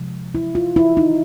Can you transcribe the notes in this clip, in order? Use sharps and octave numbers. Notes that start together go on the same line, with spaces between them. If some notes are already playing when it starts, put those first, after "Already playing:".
Already playing: C3 F3 G#3
E4
F4
E4
D#4